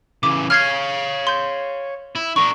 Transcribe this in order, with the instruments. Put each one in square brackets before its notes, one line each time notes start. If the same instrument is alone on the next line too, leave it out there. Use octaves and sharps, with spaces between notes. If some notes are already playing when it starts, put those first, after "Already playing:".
[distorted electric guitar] C#3 E3 [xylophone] D6
[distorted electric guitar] C#5 F5 [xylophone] F6 G#6 C7
[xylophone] C6 G6
[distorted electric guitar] E4
[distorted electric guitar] D4 A#4 [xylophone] C#6